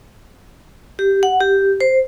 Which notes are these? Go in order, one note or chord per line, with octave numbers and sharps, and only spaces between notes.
G4
F#5
G4
C5